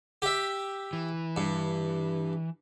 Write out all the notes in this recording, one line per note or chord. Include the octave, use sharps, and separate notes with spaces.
G4 E5
E3
G2